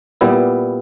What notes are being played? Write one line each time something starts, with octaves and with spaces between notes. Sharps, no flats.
A#2 G3 B3 E4